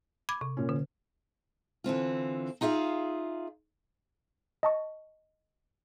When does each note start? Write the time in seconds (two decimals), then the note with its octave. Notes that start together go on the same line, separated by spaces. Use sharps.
0.29 B5 D6 G#6
0.41 C3
0.57 A#2 C#4
0.69 D3
1.84 D3 E3 C4 F4
2.61 D#4 F4 G#4 E5 F5
4.63 D#5 A5 C#6